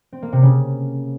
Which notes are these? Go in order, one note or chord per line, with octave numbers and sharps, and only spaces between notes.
C4
A#3
C3
C#3